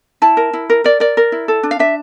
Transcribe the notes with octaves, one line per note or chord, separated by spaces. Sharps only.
E4 A5
A#4
E4
A#4
A#4 D5
A#4 D5
A#4
E4
A4
D4
F5
D4 E5